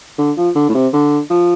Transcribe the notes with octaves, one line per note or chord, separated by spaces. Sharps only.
D3
F3
D3
A2
C3
D3
F3